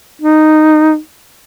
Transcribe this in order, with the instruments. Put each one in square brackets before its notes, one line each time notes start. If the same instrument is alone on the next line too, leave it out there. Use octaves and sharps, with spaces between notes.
[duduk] D#4